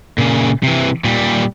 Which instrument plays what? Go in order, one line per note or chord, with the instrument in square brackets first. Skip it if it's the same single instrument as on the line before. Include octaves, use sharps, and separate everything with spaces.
[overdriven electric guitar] A#2 C#3
C3 E3
A#2 G3